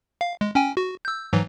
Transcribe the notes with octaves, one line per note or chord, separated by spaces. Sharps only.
F5
G#3
C#4 G5 G#5
F#4
E6 G6
G#2 E3 F#3